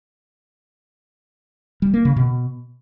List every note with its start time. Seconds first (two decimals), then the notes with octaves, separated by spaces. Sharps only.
1.82 G3
1.94 A#3
2.05 C#3
2.16 B2